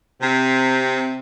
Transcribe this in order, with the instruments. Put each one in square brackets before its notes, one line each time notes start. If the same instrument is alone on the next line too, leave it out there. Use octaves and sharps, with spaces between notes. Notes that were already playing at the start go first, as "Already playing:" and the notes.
[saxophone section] C3